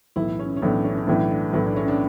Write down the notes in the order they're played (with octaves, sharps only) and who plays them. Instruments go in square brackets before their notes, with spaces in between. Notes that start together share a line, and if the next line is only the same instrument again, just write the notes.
[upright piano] B1 A2 E3 A3 [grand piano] E4
[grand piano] C#4
C#4
[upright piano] B1 A2 E3 A3 [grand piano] D4
[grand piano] C#4
C#4
[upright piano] B1 A2 E3 A3 [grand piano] D4
[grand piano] D4
[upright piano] B1 A2 E3 A3 [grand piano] E4
[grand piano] D4
C#4
D4